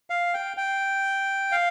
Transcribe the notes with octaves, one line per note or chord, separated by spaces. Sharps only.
F5
G5
G5
F5